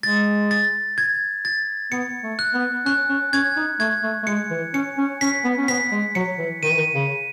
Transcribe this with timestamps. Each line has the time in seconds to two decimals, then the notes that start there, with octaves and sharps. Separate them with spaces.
0.03 G#3 A6
0.51 A6
0.98 G#6
1.45 A6
1.92 B3 C#7
2.23 A3
2.39 F#6
2.54 B3
2.85 C#4 F#6
3.09 C#4
3.33 C#4 G#6
3.56 D#4
3.80 A3 G#6
4.03 A3
4.23 A3
4.27 G#3 C#7
4.51 E3
4.74 C#4 C#7
4.98 C#4
5.21 C#4 B6
5.44 B3
5.58 C#4
5.68 B3 B6
5.91 G#3
6.15 F#3 C#7
6.38 E3
6.63 D#3 D#7
6.70 E3
6.77 D#3
6.94 C#3